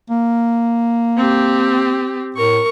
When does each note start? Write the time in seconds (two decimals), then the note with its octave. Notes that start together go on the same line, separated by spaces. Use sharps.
0.10 A#3
1.17 C4 G4
2.36 A2 A#4 C#6